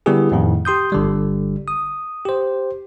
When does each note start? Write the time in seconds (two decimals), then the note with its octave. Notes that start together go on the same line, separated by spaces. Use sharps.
0.06 D3 G3 B3 E4 G4 G#4
0.32 F2 A2 D#3
0.65 G4 C6 D#6 G6
0.92 G1 D3 G3
1.68 D#6
2.26 G4 C5